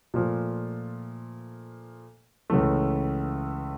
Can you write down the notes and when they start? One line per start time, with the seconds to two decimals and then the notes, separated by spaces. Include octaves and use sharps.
0.14 A#2 F3 A3
2.50 C#2 C#3 E3 A3